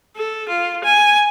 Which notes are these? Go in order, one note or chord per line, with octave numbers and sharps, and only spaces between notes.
A4
F4
G#5